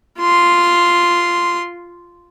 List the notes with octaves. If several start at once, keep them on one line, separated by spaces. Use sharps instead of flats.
F4 C6